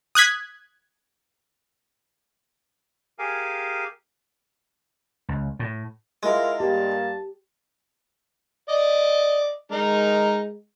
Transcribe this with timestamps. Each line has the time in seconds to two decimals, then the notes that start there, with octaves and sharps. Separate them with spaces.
0.15 D#6 F#6 G#6 B6
3.19 G4 G#4 A#4 F5 G#5
5.29 C#2
5.59 A2
6.23 G#3 E4 F4 A#4
6.60 G2 A#3 G4 A5
8.69 D5 D#5
9.72 G#3 D#4 A#4